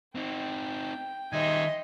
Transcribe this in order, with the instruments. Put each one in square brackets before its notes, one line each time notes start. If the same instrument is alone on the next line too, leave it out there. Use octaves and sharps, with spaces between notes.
[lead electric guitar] C4 D#4 [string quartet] G5
[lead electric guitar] D#3 G3 [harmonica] D#4 E5 G#5 [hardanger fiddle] D#5 C6